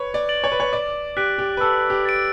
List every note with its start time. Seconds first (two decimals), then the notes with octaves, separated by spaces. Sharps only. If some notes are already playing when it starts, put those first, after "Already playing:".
Already playing: B4 C#5
0.14 D5
0.29 A6 D7 F#7
0.44 C#5
0.52 B4
0.60 C#5
0.73 D5 D6
1.17 G4 F#6 B6 D7
1.38 G4
1.57 B4
1.61 A4 E6
1.90 G4
2.05 A6 D7